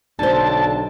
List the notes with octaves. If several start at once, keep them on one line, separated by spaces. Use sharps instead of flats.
B1 D3 C5 A5